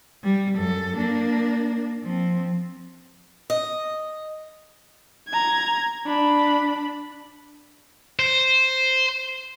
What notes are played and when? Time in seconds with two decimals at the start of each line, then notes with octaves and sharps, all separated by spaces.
0.23 G3
0.57 F#2 A4
0.97 A#3 D4
2.03 F3 C4
3.50 D#5
5.29 A#5 G#6
6.06 D4 B5
8.19 C5